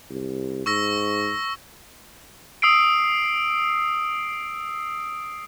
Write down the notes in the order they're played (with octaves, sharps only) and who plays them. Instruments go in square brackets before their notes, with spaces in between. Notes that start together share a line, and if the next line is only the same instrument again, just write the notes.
[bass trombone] C2
[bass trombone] G#2 [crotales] C#6 E6 A#6
[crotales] D#6 E6 C7 D7